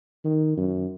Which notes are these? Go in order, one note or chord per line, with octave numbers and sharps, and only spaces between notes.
D#3
F#2